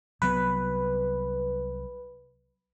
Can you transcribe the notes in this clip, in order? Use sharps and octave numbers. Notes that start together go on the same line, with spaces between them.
C2 F#3 B3 B4